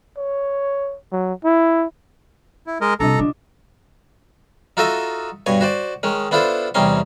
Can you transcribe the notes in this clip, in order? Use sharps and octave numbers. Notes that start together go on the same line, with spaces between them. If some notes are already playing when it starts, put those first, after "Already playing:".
C#5
F#3
E4
E4
G#3 A#4 D#5
C3 G3 D4 F4 A4 D#5 A#5
C#3 D4
D#4 F4 F#4 A4 D#5 E5
G2 B2 C#5 G#5
F#4 C5 D5
D#3 G#3 C#4
B3 D4 E4 F4 A4 C5
E2 C3 G3 C#4 D#4 C6